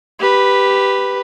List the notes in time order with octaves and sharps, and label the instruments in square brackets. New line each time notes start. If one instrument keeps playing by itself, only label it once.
[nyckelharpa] G4 B4